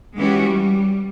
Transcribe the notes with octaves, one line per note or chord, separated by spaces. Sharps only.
E3 G#3 C#4 F#4 G4
G3